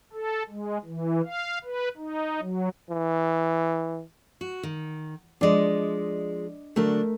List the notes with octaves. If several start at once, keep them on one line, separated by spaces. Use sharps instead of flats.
A4
G#3
E3
F5
B4
D#4
F#3
E3
F#4
D#3
F3 G#3 D4 D5 D#5
D3 F#3 A3 D4 A#4